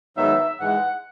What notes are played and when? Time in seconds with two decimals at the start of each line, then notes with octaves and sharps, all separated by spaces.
0.17 G#2 D#3 F#3 B3 D#4 E5
0.60 G#2 E3 G#3 F#5